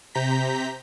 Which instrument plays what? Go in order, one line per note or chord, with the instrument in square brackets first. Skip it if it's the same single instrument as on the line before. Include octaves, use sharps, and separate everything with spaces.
[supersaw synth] C3 A#5 G6 B6